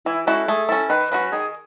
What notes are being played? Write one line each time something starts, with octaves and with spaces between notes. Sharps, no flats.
E3 E4
G#3 C#4 E4 F#4 A4
A3 G#4
C#4 E4 A4
D#3 B4
F#3 C#4 F#4 B4
D#3 G#4